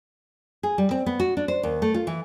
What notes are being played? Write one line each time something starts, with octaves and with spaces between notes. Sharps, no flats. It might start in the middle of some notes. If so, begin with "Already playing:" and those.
G#4
G3
C4
B3
F#4
D4
C5
D#2
A3
F4
E3